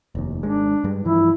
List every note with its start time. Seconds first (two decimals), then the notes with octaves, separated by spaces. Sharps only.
0.15 F1 D#2
0.43 G#1 G#3 D4
0.84 G2 G3 G#3
1.05 G2 E3 F3 E4